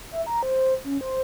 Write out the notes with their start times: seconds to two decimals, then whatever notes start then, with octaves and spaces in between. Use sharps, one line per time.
0.12 E5
0.27 A#5
0.43 C5
0.84 C#4
1.01 C5